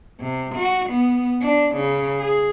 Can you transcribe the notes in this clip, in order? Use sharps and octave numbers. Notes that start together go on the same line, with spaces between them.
C3
F#4
B3
D4
C#3
G#4